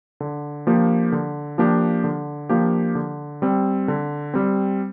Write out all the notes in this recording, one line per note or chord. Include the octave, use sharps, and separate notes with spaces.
D3
F3 A#3 D4 G4
D3
F3 A#3 D4 G4
D3
F3 A#3 D4 G4
D3
G3 C4
D3
G3 C4